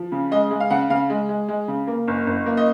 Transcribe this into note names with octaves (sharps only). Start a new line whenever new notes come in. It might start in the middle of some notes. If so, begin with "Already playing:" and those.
Already playing: F3
C#3
G#3 D#5
G#3
F5
C#3 F#5
C#3 F5
G#3
G#3
G#3
C#3
A#3
F#1
F#1
A#3
D#5